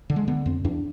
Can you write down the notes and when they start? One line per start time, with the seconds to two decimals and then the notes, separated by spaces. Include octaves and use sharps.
0.10 D3
0.16 G#3
0.28 D3 B3
0.46 F2 C4
0.65 E2 D4